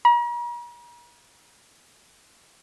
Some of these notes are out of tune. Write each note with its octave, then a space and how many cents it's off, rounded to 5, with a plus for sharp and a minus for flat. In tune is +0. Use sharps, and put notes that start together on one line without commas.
A#5 +45